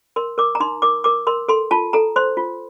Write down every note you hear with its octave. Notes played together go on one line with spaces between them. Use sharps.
A#4 C6
A#4 D6
A#5
D#4 C6
A#4 D6
A#4 D6
A#4 C6
A4 C6
F4 A5
A4 A#5
C5 C6
F4